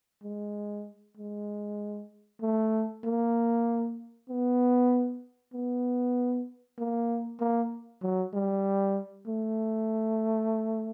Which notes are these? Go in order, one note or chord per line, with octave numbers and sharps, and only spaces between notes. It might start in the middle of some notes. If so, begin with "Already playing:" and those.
G#3
G#3
A3
A#3
B3
B3
A#3
A#3
F#3
G3
A3